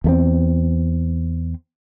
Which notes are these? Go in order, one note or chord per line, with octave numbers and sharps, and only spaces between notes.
E2 A3 C4